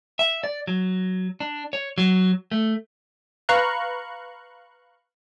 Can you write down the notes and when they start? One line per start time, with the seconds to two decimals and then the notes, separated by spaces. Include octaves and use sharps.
0.19 E5
0.44 D5
0.67 F#3
1.40 D4
1.73 C#5
1.98 F#3
2.52 A3
3.49 B4 F5 A#5 C#6 F#6